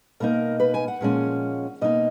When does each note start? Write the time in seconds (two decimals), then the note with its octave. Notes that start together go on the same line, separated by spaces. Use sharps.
0.20 B2 A#3 D#4 A#4
0.60 B4
0.74 G#5
0.88 F#5
1.01 A#2 F3 G#3 C#4
1.81 B2 A#3 D#4 D#5